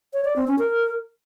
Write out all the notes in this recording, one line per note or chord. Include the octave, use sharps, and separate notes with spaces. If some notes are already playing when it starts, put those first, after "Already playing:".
C#5
D5
C4
C#4
A#4